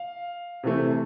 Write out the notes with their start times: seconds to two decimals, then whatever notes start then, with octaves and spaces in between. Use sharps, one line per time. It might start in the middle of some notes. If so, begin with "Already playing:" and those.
Already playing: F5
0.63 C3 E3 A3